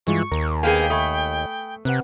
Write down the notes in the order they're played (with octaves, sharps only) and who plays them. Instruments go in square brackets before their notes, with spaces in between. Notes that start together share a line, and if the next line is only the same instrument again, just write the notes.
[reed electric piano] G2 G#3 F4 [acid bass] E3 [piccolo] C#6
[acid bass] D#2 [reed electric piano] A#4
[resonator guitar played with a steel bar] A#3 B3 G#4 [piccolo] G5
[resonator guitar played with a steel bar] A3 [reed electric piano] G#5 B5 D#6
[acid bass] C3 [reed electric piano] C4 B4 F#5 [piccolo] F#6